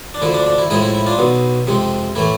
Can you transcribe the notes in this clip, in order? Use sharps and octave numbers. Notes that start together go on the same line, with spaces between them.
D4
D2 D3 F3 E4
D4
D4
E4
A2 F3 G#3 E4 G#4
E4
E4
D4 F4
B1 B2 B3
F2 C3 G#3 C4
A2 E3 A3 E4